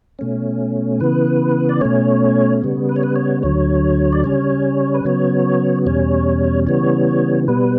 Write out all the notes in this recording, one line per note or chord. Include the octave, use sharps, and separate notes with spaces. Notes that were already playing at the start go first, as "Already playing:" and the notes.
B2 A3 C#4
C#3 E3 B3 B4
D5
B2 A3 C#4 C#5
C#3 G3 B3
B4
C#5
B4
C#5
D2 D3 F#3 C#5
D5
C#3 G3 C#4 C#5
B4
C#3 F#3 B3 C#5
E2 B2 G3 C#4 C#5
C#3 E3 G3 B3 C#5
B2 G3 B3 B4